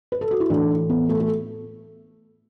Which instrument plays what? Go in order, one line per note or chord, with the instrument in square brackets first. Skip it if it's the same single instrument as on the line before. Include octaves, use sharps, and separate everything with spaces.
[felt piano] B4
A4
F#4
E4
A2 E3 A3 D4
B3
A3
A3